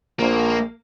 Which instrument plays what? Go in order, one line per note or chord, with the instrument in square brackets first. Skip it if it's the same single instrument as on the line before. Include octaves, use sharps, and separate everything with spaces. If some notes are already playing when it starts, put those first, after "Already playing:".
[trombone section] A#1 [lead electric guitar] A#3